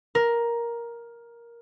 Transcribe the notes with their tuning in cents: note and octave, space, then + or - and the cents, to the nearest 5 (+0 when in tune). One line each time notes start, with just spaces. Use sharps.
A#4 +10